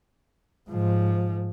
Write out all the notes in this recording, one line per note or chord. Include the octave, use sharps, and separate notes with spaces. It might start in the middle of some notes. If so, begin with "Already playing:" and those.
G#2 F3